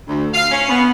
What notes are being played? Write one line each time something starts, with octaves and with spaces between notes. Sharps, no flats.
D2
F5
C#4
B3